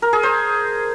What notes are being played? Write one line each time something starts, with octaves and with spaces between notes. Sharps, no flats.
A#4
G#4
C5